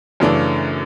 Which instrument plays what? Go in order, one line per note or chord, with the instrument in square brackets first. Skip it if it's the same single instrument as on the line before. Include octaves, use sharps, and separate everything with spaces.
[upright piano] F#2 C#3 E3 A3 D4